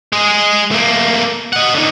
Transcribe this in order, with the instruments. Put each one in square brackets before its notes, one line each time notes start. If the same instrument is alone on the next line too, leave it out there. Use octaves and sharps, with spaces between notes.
[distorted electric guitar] G#3 G#4
A3 A#3
D#5 F#5
D3 D#4